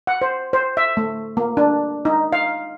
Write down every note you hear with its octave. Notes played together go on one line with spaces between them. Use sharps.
F#5
C5
C5
E5
A3
A#3
D4
D#4
F5